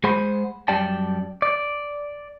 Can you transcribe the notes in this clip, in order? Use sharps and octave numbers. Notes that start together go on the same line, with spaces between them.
G#3 G#4 C5 F#5 B5
F#2 G3 G4 D5 G5 A5
D5